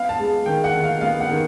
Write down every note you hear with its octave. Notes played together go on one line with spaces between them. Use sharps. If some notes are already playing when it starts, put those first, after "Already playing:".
Already playing: B3 F5
A5
G#3
D#3 G5
F#5
D#3
F5
B3 F5
F#5
D#3